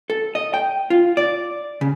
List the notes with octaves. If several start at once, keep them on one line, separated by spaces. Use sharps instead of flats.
A4
D#5
G5
F4
D5
C#3